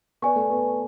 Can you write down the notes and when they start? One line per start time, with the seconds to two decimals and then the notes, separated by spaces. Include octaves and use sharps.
0.22 B3 B4 D5 G#5 C#6
0.36 A3
0.50 B3